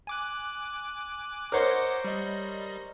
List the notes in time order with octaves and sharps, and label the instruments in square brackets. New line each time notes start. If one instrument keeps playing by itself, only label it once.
[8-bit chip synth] G#5 D6 F#6
[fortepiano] A#4 C5 C#5 [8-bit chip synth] D#5 F#5 D6
[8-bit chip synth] G3 D#5